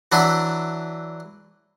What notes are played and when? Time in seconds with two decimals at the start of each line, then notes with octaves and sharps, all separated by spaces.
0.12 E3 F#3 D4 E4